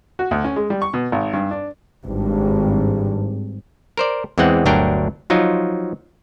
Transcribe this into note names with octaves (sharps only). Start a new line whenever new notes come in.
F#4
D2
C#4
G#3
G3
C#6
B2
G#1
G2
D4
G#1 G2
A#4 C5 D5
E2 E3 G#3 C4 F#5
G1 D2 F#3 D4 A#4 G5
F3 F#3 D#4 F4